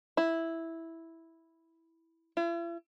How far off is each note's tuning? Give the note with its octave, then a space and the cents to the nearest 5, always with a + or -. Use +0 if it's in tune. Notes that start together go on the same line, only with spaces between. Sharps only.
E4 -5
E4 +45